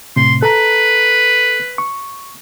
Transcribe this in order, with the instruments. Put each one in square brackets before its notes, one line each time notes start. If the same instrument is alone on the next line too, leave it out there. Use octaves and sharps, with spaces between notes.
[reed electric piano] A2 C3 [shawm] C6
[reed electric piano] A4 A#5 [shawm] B4
[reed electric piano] C#6